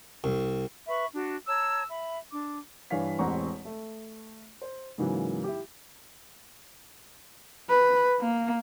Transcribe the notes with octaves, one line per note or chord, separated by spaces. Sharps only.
C2
B4 E5 B5 C#6
D4 F#4
C#5 A5 A#5 E6
E5 B5
D4 D6
G2 E3 D4 C#5 F5 B6
E1 A1 C4 F#5 A#5 C#6
A3
C5
G#2 C#3 E3 F#3 A#3
E4 G4
B4
A#3